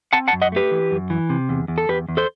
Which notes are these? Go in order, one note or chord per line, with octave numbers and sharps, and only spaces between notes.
C4 F#5 A5
F#5 A5
F#2
D#5 F#5
A3 G4 B4
E3
F#2
E3
C3
E2
E2
A4
E2 G4 B4
E2
A4 C5